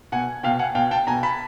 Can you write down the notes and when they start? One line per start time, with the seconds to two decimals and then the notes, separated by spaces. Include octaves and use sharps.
0.12 B2 F#5 G#5
0.43 B2 F5 G5
0.59 F#5 G#5
0.75 B2 F5 G5
0.91 G5 A5
1.07 B2 G#5 A#5
1.23 A5 B5